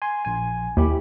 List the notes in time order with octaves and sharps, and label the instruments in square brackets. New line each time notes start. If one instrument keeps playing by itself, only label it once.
[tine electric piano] G#5 C6
A#1 G#5
[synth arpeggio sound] D#2 [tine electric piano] E4 G4 B5